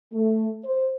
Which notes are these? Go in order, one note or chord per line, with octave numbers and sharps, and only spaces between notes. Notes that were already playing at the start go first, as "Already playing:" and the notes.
A3
C5